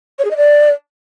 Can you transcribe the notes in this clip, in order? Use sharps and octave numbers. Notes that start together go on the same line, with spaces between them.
C#5
G#4
D#5
D5